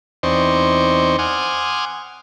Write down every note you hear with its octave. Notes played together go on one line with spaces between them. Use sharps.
E2 C4 D#4 C5 D5 C#6
F#5 G#5 C6 D6 D#6 F6